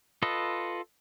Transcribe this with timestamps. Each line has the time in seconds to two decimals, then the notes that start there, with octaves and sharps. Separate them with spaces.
0.22 F4 A4 B4 D#5